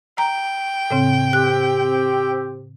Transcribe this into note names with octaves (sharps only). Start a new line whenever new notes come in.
G5 A#5
A2 C#3 C4
C4 G4 F#6